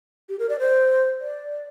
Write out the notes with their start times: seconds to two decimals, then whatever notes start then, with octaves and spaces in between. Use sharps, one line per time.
0.29 G4
0.39 A#4
0.49 D5
0.59 C5
1.20 D5